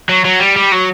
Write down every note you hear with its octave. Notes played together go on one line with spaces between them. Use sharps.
F#3
F#3
G3
G3
F#3